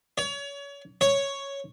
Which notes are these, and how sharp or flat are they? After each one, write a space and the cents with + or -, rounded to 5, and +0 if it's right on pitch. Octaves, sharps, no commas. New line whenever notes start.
C#5 +30
C#5 +0